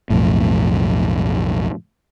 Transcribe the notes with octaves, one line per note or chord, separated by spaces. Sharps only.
B1 F2 A2